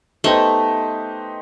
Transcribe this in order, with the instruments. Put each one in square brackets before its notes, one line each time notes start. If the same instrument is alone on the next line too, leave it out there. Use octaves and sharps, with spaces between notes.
[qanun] A3 [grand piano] B3 D#4 G4 C5 D#5